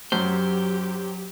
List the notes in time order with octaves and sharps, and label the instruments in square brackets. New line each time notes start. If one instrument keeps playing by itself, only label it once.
[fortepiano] F#2 [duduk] F#3 [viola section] G4 [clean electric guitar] C5